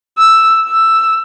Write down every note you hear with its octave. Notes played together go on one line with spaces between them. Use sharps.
E6
E6